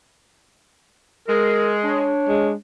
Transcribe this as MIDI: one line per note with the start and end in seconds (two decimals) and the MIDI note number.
1.28 2.10 56
1.28 1.75 70
1.84 2.53 62
1.84 2.50 73
2.29 2.54 56